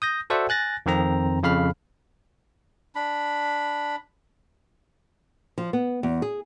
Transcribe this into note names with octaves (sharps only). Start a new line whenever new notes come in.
D#6 G6 A#6
F#4 A4 C5 D5 E5 F#5
G#5 F#6 A6 A#6
F2 D#3 C4 A#5
F2 C#3 F5 B5 F6
D4 B5
F3
B3
E2
G#4